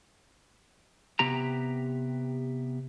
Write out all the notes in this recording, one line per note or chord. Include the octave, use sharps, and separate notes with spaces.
C3 B3 G4 A#5